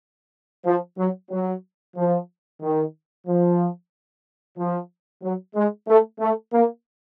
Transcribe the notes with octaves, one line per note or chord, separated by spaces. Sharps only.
F3
F#3
F#3
F3
D#3
F3
F3
F#3
G#3
A3
A3
A#3